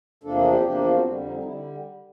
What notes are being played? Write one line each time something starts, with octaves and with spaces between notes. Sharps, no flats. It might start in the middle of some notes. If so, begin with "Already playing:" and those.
E2 C3 F3 A#3 D4 A4
G#4
G4
E2 C3 F3 A#3 D4 G4
F4
F#4
F2 D3 G3
D#4
D#4
D3 G3 E4